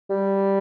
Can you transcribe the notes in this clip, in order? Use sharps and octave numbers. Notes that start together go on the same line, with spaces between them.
G3